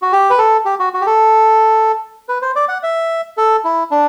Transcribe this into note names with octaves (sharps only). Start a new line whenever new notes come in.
F#4
G4
B4
A4
G4
F#4
F#4
G4
A4
B4
C5
D5
F#5
E5
A4
E4
D4